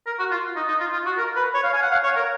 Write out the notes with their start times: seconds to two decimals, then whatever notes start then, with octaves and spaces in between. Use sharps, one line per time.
0.06 A#4
0.19 F#4
0.31 F4
0.56 D#4
0.68 D#4
0.80 F4
0.93 F4
1.05 F#4
1.17 A#4
1.36 B4
1.54 C#5
1.63 F5
1.73 G#5
1.82 F#5
1.91 F5
2.03 C#5
2.16 A#4